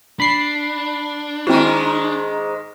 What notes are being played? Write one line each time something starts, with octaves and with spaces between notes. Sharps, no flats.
D4 B5 C7
G#2 D#3 G#3 C4 E4 F#4